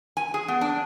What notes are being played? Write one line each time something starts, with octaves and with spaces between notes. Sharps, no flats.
G#5
G#4
B3
D4